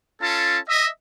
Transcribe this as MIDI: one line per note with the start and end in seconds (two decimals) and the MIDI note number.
0.23 0.59 61
0.23 0.59 65
0.23 0.59 69
0.23 0.59 81
0.68 0.87 75
0.68 0.87 76